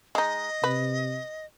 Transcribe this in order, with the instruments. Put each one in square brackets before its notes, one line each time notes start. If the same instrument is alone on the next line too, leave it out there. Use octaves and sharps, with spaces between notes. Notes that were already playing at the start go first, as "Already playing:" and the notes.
[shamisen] G#3 D#4 [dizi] D#5
[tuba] C3 [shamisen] B4